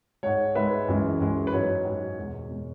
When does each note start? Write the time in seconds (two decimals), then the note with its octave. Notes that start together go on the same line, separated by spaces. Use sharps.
0.23 G#2 G#3 C#5 F#5
0.55 G#2 G#3 B4 E5
0.88 F#2 E3 G#3
1.20 F#2 E3 G#3
1.47 B4
1.53 G#2 F#3 C#5
1.85 G#2 F#3
2.18 E2 B2 G#3
2.50 B2 G#3